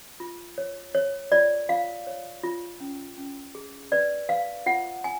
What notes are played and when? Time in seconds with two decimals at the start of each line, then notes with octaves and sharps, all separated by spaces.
0.20 F4
0.58 C#5
0.95 C#5
1.32 F4 D5
1.69 F4 F5
2.07 C#5
2.43 F4
2.80 C#4
3.18 C#4
3.55 G#4
3.92 B4 D5
4.29 B4 F5
4.66 F4 F#5
5.04 G#5